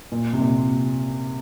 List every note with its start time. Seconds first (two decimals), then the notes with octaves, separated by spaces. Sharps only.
0.12 A#2
0.33 C3
0.40 A#2